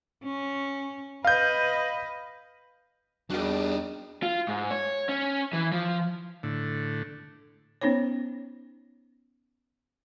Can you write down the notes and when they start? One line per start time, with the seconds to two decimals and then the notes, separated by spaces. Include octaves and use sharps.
0.24 C#4
1.25 B4 D#5 F5 G6
3.30 E2 G3 D4 D#4 F#4 A#4 G5
4.23 F4
4.48 G#2
4.71 C#5
5.09 C#4
5.53 E3
5.72 F3
6.43 A2 D3
7.81 B3 C#4 D#4 C5 C#5